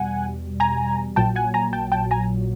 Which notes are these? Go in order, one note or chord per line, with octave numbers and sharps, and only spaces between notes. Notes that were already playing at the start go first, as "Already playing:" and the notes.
Already playing: E2 B2 G3 F#5 G#5
G#5 A#5
A#1 A#2 F#3 G5 A5
F#5 G#5
G#5 A#5
G5 A5
G5 A5
G#5 A#5